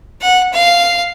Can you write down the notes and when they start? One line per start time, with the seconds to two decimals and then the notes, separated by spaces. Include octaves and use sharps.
0.21 F#5
0.53 F5